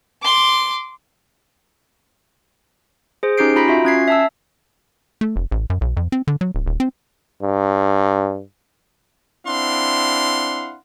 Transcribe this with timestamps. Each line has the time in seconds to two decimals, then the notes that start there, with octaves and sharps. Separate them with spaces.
0.22 C6 D6
3.23 G#4 C5
3.38 C#4 D#4 G4 G6 C7 D7
3.56 F4 A#5 B5 B6 D7
3.68 F4 F#4 E5
3.85 C#4 G#6 C7
4.08 E5 A5 E6
5.21 A3
5.36 F1
5.51 A1
5.70 F#2
5.81 B1
5.97 F2
6.12 C4
6.27 D3
6.41 F#3
6.55 D1
6.66 D#1
6.80 C4
7.43 G2
9.46 C4 D4 E4 F5 F#5 C6